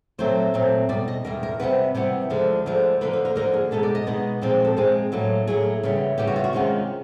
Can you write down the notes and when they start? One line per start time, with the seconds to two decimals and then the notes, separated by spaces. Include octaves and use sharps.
0.18 A#2 F#3 A3 C4 C5
0.54 A#2 F#3 A3 C4
0.89 E2 B2 G3 D5
1.08 D#5
1.24 E2 B2 G3 A#4
1.43 A#4
1.59 C3 E3 G3 B3 B4
1.95 C3 E3 G3 B3
2.30 D2 D3 F3 G#3
2.66 D2 D3 F3 G#3
3.01 D3 F3 A#3 D#4 B4
3.13 B4
3.25 A#4
3.36 D3 F3 A#3 D#4 A#4
3.54 G#4
3.71 B2 G#3 B3 D#4 A4
3.83 D5
3.95 D#5
4.07 B2 G#3 B3 D#4
4.42 A#2 F3 G#3 C4 D#5
4.65 A4
4.77 A#2 F3 G#3 C4 G#4
5.12 A2 F#3 A#3
5.47 A2 F#3 A#3 G#4
5.83 C#3 E3 G3 B3
6.18 C#3 E3 G3 B3 G4
6.27 F#4
6.36 F4
6.44 F#4
6.53 C3 D#3 G#3 C#4 F4